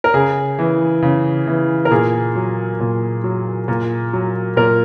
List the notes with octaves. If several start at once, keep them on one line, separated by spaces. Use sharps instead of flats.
A#4
C#3 G#4
E3
C#3
E3
A#4
A#2 G#4
F#3
A#2
F#3
A#2
F#3
A#2 A#4